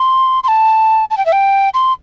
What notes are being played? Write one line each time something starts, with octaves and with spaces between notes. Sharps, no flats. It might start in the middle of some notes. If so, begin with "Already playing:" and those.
Already playing: C6
C6
A5
A5
G5
E5
G5
C6